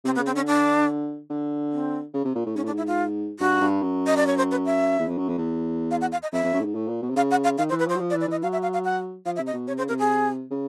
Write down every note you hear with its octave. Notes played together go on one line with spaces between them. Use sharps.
C3 C4
B3
C#3
C4
D3 C#4
D4
D3
C4
C#3
C3
A#2
A2
G#2 C#4
A2 D4
G#2
E4
F4
G2 F#4
G2
F#2
D#5
D5
C#5
C5
B4
E5
E2
F2
F#2
F2
E2
F5
F#5
F5
D#5
F2 E5
F2
F#2
A2
G#2
A2
A#2
B2
C3
C#3 F5
F#5
F5
D#3 F5
C5
E3
B4
F3 C5
F#3
F3
D5
E3
D5
E3 D#5
F#3 F5
E5
F5
F5
F#5
F3 F5
E5
C3
D#5
B2
C3 C#5
C#3 C5
C3 A#4
G#4
C#3